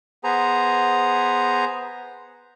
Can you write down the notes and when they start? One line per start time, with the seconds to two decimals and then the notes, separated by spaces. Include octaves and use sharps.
0.24 B3 G#4 C5 A#5